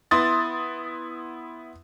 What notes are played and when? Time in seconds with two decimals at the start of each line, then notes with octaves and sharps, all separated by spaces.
0.11 B3 E4 C6 D#6 A6